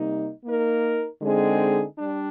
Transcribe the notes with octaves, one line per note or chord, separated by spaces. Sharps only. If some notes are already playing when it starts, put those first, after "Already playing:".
Already playing: C3 G3 A#3 D#4
A#3 D#4 A#4
D3 G#3 C4 D#4 G#4
G3 D4